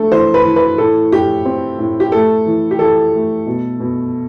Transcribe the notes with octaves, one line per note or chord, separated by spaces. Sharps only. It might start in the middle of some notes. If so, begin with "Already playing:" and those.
Already playing: A3 D4 A4
E3 C5
B4
E3
B4
A2 A4
A2 G4
C4
A2
G4
A3 A4
E3
G4
E3 A4
A3
B2
B2